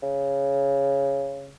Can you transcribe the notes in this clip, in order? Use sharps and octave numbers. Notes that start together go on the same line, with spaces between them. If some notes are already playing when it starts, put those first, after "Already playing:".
C#3